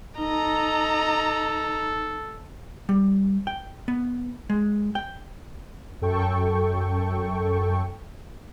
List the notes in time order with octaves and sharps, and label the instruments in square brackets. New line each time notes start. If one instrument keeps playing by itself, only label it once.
[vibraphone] D#4 [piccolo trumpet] A4 [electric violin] D#5 A#5
[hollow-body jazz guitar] G3
G5
B3
G#3
G5
[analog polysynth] F#2 A4 G5 C#6